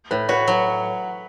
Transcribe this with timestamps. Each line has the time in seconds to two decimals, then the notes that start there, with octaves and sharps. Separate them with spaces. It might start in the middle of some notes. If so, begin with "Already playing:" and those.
0.11 A2 B4
0.29 F#4 B4 C#5
0.48 F#3